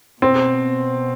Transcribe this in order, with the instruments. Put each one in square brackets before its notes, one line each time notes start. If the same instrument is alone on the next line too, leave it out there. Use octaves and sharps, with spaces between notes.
[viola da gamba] B2 [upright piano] C4